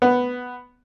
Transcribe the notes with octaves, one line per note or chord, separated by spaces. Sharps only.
B3